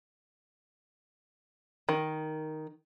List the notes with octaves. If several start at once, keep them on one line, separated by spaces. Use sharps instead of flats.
D#3